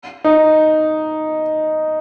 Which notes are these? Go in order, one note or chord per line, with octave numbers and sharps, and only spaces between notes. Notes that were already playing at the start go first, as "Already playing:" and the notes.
D#4